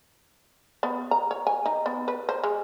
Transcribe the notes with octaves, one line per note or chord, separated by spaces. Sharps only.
B3
A#5
C#5
G#5
D#4
B3
B4
C5
G#3